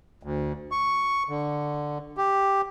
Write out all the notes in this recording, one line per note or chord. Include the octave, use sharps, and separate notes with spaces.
D2
C#6
D3
G4